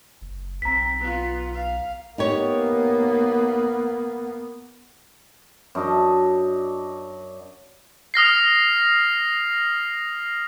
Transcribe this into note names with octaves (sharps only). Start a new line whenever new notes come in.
F#1
B1 C4 A#5 B6
B3 F4
F5
A#3 B3 D#4 G4 C#5
F#2 D4 D#5 A5
D#6 F6 A#6 C7